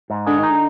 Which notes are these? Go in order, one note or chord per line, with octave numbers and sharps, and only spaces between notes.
G#2
D3 G#3
D#3
D#4
D3